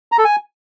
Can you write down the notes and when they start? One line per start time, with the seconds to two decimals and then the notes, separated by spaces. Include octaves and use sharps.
0.12 A#5
0.18 A4
0.24 G#5